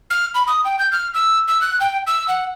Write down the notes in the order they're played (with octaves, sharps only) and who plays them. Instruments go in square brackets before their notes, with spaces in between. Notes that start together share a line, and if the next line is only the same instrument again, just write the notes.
[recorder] F6
B5
D#6
G5
G6
F6
E6
E6
F#6
G5
E6
F#5